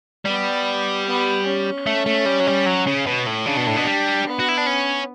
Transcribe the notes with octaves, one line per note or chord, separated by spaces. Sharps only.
G3 B3
B3
C#4
A3
A3
G3
F#3
G3
F#3
C#3
B2
A2
C#3 D4
B2
A2
B2
G3
B3
F#4
E4
D4
C#4